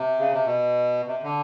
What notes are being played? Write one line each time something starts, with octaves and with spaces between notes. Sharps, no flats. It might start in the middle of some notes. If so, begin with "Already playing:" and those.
Already playing: C3
C#3
C3
B2
C3
D3